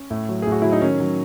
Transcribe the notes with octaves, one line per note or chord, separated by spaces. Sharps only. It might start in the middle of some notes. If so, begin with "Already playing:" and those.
Already playing: C#4
A2
F#3
A2 G#4
F#4
F#3 E4
D#4
D#3 C#4
F#3